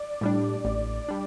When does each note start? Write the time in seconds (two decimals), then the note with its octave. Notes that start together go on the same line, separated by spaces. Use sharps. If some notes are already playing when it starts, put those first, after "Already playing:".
Already playing: D5
0.21 A2 G3 D4
0.65 A1
1.08 G3 D4